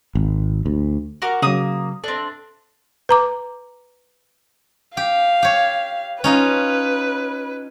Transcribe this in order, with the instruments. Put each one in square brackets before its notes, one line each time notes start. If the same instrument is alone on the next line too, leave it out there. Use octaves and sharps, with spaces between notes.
[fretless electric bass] G#1
D2
[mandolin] F#4 A#4 D6
[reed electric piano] C#3 F#3 [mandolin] A#3 D#6
[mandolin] C4 D4 [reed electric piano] A4
[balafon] B4 A#5 D6
[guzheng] G4 [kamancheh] F5
[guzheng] G4 C#5
[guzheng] C#4 D#4 F4 [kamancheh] B4